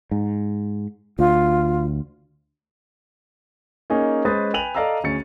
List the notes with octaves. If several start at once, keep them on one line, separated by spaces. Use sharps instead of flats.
G#2
D2 F4
A#3 C#4 D#4 G#4
G#3 C#4 B4 C5 D#6 A6
B4 G5 G#5 D#7 F7 F#7
A4 D5 D#5 F5 A#5 E6
D2 C#4 G#4 A6 C#7